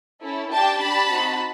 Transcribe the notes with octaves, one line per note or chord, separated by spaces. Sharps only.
C#4 E4 A4
D4 G4 G5 A5
D4 G4 A5 B5
C4 D#4 F#4